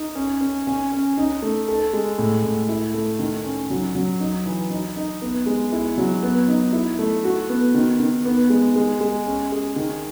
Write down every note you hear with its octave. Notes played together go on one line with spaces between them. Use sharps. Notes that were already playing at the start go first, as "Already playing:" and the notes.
Already playing: D#4
C#4
C#4
C#4
C#4
D#4
A3
A4
G#3
A2
A2
E4
A3
D#3
C#4
F#3
F#3
D#4
E3
D#4
D#4
B3
G#3
E4
F#3
B3
D#4
E4
A3
F#4
B3
D#3
D#3
B3
G#3
G#3
G#3
C#4
G#4
D#3